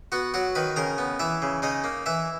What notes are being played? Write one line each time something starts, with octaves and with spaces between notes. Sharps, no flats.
B3 F#4 F#5
F#3 F#4 F#5
D#3 B4 B5
C#3 A#4 A#5
B3
E3 E4 E5
C#3
C#3 D#4 D#5
A#3
E3 E4 E5